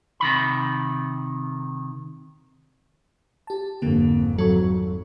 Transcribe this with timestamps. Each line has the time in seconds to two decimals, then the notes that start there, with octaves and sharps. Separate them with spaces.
0.20 C3 D#3 B5
3.47 G4 A5
3.82 G#1 F2 D3 A#3
4.38 F#3 A4 C#6